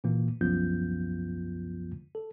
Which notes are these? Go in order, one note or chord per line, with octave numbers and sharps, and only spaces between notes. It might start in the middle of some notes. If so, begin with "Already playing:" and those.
A#2 E3 A#3
C2 F#2 F3 B3 F4 G6
A4